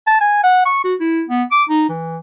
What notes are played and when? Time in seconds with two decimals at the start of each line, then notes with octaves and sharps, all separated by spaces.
0.07 A5
0.21 G#5
0.44 F#5
0.66 C#6
0.85 F#4
1.00 E4
1.28 B3
1.51 D6
1.69 D#4
1.89 E3